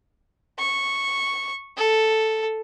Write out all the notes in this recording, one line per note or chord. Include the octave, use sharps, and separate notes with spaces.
C#6
A4